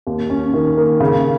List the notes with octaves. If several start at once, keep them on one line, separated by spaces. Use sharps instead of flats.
D#2
C#4
D#3
A#3
C#3